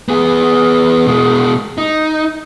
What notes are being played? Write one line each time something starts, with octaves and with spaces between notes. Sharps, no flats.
B3 G#4
B2 G#3
D#4